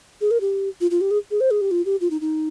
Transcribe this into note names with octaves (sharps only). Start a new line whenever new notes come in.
G#4
A#4
G4
F4
F4
G4
G#4
G#4
C5
G#4
G4
F4
G4
F4
D#4
D#4